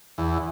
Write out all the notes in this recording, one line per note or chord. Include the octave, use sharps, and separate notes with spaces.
E2